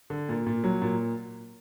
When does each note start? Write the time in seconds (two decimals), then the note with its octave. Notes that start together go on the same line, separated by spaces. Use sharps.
0.10 D3
0.29 A#2
0.46 A#2
0.64 F#3
0.82 A#2